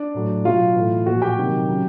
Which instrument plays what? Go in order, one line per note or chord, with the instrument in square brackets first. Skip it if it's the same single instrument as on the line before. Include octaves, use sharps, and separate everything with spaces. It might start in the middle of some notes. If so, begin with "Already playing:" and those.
Already playing: [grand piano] D4 D5
A2 F#3
B2 F#3 F4 F5
A2 E3
A#2 F3 F#4 F#5
G4 G5
C3 D#3 F#3
C#3 F#3